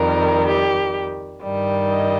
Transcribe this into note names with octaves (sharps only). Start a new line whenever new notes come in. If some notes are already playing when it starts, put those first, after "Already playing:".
Already playing: F2 D#3 G3 A#4
G4
G2 D#3 G3
D#5